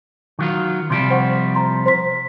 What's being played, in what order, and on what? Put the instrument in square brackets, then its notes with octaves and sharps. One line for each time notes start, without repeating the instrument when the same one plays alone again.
[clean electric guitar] D#3 F#3 F4
[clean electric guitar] C3 F3 G3 [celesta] C6 D7
[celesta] C5 F#5 C#6
A#5 C6
C5 C6 B6